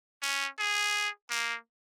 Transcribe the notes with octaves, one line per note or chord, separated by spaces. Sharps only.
C#4
G#4
A#3